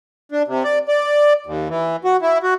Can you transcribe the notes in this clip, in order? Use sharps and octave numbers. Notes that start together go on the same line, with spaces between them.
D4
C3
D5
D5
D#2
E3
F#4
E4
F#4